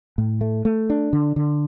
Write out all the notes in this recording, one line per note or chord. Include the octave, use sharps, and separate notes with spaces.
A2
A3
A3
D4
D3
D3